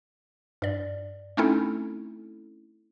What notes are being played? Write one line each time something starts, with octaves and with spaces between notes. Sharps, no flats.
G2 D5
A3 C4 C#4 D#4 E4 A4